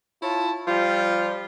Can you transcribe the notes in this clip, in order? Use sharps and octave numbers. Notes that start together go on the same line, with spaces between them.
E4 F4 C#5 A5
F3 G3 F4